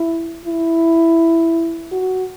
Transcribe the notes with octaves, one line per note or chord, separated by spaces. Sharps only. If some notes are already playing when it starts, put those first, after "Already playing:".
Already playing: E4
E4
F#4